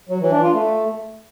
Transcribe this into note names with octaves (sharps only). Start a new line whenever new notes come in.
F#3
E3
D4
F4
A3